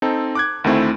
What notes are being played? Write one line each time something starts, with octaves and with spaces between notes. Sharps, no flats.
C4 D#4 A4
D6 F#6 G#6
D2 D#3 A3 C4 E4